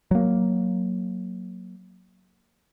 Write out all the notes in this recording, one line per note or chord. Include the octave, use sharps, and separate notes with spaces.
F#3 A#3